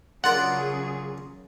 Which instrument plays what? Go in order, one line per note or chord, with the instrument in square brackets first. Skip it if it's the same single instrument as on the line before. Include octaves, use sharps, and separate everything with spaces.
[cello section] C#3 F#3 G#4 [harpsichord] D4 F4 A#4 [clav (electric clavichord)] F#5